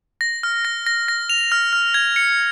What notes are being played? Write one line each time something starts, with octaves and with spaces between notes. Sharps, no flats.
A#6
F6
A#6
A#6
A#6
F7
F6
F6
G#6
C#7